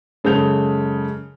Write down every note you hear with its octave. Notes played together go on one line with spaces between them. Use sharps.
F#2 C#3 G#3 A4 G6 F7